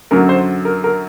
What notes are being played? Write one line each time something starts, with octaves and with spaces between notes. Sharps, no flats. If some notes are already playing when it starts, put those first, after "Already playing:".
F#2 D3 F#3 A#4
C5
A#4
A#4